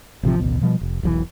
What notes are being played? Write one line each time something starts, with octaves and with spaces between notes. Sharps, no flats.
A1 C3 D#3 F3
A1 D2 B2
B2 F3 G3
F1
E1 B1 D#3 E3